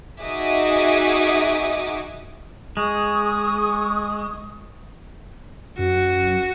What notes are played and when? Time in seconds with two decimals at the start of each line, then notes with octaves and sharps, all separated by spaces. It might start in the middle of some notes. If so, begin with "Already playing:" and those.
0.22 D#4 F#4 G#4 E5 D6 D#6
2.77 G#3 C#6 D#6
5.79 F#2 F#4